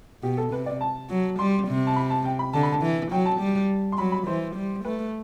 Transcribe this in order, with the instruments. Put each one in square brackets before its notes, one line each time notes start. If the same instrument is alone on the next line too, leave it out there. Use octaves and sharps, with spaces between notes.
[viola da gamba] B2 [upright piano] G4
[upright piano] A4
[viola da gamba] C3 [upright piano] B4
[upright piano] D5
A5
[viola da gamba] F#3
[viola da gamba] G3 [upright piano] C6
[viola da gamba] C3
[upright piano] A5
B5
A5
G5
B5
[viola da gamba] D3 [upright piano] A5
[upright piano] B5
A5
[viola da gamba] E3
[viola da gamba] F#3 [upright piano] G5
[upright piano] A5
[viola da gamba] G3
[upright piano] C6
[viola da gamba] F#3 [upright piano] B5
[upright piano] B5
[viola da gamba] E3 [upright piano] C5
[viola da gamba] G3
[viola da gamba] A3 [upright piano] B4